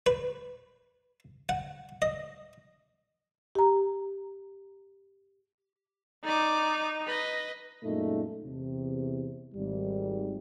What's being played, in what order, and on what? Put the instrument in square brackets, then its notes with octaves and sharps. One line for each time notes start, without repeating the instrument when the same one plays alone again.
[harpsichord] B4
F#5
D#5
[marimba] G4 A#5
[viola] D#4 [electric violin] D5 D6
[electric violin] B4 D#5
[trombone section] F#2 A#2 G#3 A3 D#4
E2 C3
G#1 G3